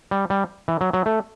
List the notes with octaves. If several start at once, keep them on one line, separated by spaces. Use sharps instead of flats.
G3
G3
E3
F#3
F#3
A3